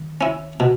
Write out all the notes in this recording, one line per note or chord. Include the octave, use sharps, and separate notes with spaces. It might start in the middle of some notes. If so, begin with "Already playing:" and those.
Already playing: D#3
C#4 E4
B2